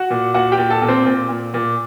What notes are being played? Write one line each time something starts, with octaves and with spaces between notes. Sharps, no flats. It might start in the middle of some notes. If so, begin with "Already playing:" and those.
Already playing: F#4 F#5
A#2
A#2 F#4 F#5
G4 G5
A#2
A4 A5
A#2
C4 C5
A#2
A#2
A#2